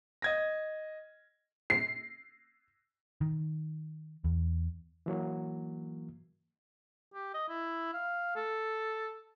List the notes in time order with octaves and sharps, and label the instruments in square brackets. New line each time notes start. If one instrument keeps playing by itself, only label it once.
[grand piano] D#5 G#6 A#6
[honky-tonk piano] C7
[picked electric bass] D#3
E2
[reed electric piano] E3 F#3 A#3
[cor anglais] G4
D#5
E4
F5
A4